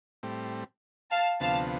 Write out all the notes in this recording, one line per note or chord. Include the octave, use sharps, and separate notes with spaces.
A2 G3 C4
F5 A5
D2 C3 F3 B3 F5 A5